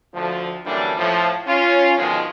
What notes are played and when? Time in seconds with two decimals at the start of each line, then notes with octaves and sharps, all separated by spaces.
0.14 D2 F3
0.64 F#2 D3 E3 G3 A#3 D4
0.96 A2 F3
1.46 C#4 F4
1.97 B2 D3 D#3 F3 G#3